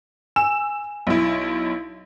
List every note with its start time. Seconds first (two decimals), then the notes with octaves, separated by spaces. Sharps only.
0.36 G#5 E6 E7
1.07 B1 E4